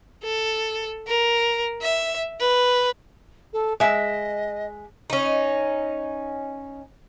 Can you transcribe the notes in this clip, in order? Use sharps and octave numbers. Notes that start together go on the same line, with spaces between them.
A4
A#4
E5
B4
A4
G#3 D#5 E5
C#4 D#4